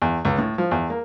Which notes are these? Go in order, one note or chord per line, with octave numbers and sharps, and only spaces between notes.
E2
C#2
A2
F3
E2
A#3